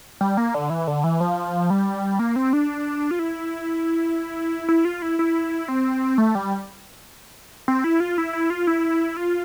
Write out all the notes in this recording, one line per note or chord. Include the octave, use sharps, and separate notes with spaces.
G3
A#3
D3
E3
D3
E3
F3
G3
A#3
C4
D4
F4
E4
E4
F4
E4
E4
C4
A3
G3
C4
E4
F4
E4
E4
F4
E4
F4